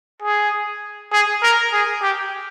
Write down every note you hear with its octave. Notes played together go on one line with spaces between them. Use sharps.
G#4
G#4
A#4
G#4
G4